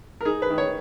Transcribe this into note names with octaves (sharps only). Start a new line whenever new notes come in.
A#4
D#4 G#4
B4
D#3
C#5